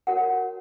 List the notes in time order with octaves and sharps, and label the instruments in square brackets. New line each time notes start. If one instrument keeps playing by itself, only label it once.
[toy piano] F#4 A#4 C#5 F#5